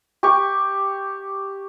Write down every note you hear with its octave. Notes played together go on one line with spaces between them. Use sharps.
G4 C#6